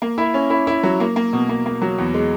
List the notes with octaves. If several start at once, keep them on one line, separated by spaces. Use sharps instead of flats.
A#3
E4
C#4
E4
E4
F#3
A#3
A#3
B2
A#3
A#3
F#3
E2
G#3